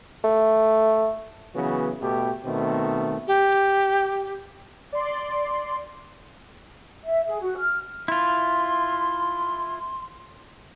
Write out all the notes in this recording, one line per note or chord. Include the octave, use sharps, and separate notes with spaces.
A3
C#3 E3 F#3 B3 F#4
B2 A3 G4
B2 D#3 A3 C4
G4
D5 C6
E5
G#4
F#4
F6
E4 F4 C6